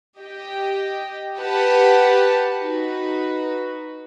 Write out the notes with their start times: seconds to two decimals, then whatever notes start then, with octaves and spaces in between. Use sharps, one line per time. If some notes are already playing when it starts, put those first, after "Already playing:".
0.18 G4 D#5 G5
1.37 G4 B4 F#5 A5
2.58 D#4 F#4 B4